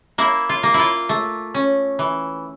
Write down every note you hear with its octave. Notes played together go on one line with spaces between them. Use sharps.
A#3 E4
F4
A#3
E4
F4
A3
C#4
E3